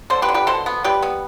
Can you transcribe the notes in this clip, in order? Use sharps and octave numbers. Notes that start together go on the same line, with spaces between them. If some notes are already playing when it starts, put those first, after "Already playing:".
D3 A4 C5
G4 B4
D3
G4 B4
B2 A4 C5
B3
G3 G4 B4
B3